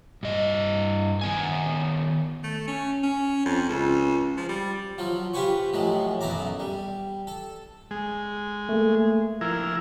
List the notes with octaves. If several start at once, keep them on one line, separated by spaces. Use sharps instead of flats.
G2 D#5
D#3 B3 G#5
A3
C#4
C#4
F2
C#2
F3
G3
F3 F#3 F4
F4 G4 B4 C5 G#5 C#6
A2 F3 F#3 G#3
B1 F#2 E4 A5 A#5 D6
G3
A4
G#3
A3 A#3
F3 E4 A#4 F6 G#6